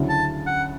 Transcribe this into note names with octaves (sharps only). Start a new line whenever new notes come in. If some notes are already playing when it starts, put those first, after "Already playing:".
Already playing: D2 C#3 F#3 C#4 E4
A5
F#5